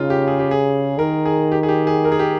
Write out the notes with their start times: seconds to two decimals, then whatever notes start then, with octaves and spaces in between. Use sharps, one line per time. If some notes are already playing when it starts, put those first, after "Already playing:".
Already playing: C#3 D#4 F4
0.10 G4
0.28 G#4
0.39 G4
0.51 G#4
0.98 D#3 A#4
1.25 G#4
1.52 G4
1.63 G#4
1.68 G4
1.87 G#4
2.04 A#4
2.12 G#4
2.19 G4